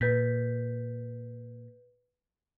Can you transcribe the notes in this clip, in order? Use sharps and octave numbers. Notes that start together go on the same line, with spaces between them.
A#2 B4 G6 B6